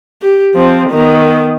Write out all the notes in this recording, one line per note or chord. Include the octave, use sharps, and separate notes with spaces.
G4
F3 C4
D#3 B3